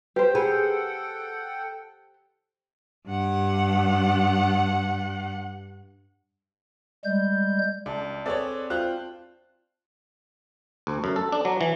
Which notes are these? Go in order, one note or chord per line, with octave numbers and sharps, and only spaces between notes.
G4 B4 C5
G#4 A4 F#5 G5 B5
G2 F#5
G3 G#3 G6
C#2 D5 A5
C4 G#4 A4 B4 C#5 D5
F4 C5 G5 F#6
D2
F#2
A4
D4
F#3
E3